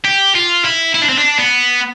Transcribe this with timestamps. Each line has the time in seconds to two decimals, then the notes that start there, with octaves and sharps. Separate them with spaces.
0.05 G4
0.35 F4
0.64 E4
0.94 E4
1.02 D4
1.09 C4
1.18 D4
1.39 B3